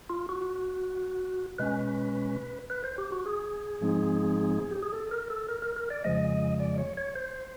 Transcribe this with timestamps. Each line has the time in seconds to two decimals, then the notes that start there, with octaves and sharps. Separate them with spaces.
0.10 F4
0.29 F#4
1.58 B2 G#3 C#4 B4
2.70 B4
2.84 C5
2.98 G4
3.12 F#4
3.26 G#4
3.81 G#2 F3 G#3 C4 D#4
4.71 G4
4.83 G#4
4.93 A4
5.11 A#4
5.30 A4
5.49 A#4
5.62 A#4
5.76 A#4
5.90 D5
6.04 F2 C#3 F3 G#3 D#5
6.60 D5
6.78 C#5
6.97 C#5
7.15 C5